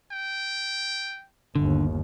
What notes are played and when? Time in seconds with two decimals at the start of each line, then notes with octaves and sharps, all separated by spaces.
0.12 G5
1.55 G1 D#2 D3